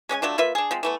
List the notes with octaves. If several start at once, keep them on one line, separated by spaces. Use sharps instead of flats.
G#3 C#4 D5 G#5
F#3 A3 D4 F4
A#3 F4 B4 E5
D4 G#4
F3 G#3 C4
E3 A3 B3